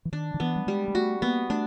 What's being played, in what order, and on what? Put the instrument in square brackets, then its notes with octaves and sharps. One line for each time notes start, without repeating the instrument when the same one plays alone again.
[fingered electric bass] E3
[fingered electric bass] D#3 [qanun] D4
[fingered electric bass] D#3
[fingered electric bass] E3 [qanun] B3
[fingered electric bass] G3
[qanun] G3 [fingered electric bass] G#3
[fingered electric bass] G#3
[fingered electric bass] A3 [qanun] F#4
[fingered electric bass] A#3 [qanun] B3
[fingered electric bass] A3 [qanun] D4